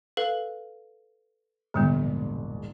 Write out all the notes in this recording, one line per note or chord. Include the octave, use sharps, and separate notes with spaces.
A4 B4 F5
E1 A#1 G#2 D3 G3 B3